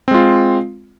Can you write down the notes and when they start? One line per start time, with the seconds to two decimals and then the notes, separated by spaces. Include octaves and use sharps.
0.08 C4
0.11 G#3
0.14 F4